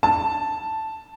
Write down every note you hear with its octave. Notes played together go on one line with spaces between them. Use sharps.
A5